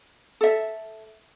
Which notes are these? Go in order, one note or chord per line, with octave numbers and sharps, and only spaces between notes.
A4 E5